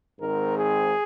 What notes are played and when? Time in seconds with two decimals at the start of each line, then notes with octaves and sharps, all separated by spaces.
0.21 G#1 G#2 D#3 C4 A#4
0.57 G#4